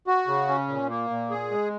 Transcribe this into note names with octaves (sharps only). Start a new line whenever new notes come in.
F#4
C#3
C#4
A#2
A#3
A#2
G#4
G#3